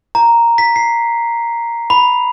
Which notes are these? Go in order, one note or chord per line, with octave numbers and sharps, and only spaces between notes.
A#5
B6
C7
B5